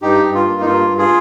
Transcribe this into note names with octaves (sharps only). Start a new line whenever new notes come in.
G2 D#4 G4
G2
F4
A#3
D#4
G2 F4
G2
F4 G#4